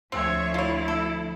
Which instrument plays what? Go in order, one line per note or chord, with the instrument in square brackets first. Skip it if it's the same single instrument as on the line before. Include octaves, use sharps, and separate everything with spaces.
[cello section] D2 F3 [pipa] C4 [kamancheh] C#5 E5
[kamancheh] E4 [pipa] F4 C#5
[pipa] A4